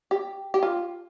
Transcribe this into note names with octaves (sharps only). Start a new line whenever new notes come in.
G4
G4
F4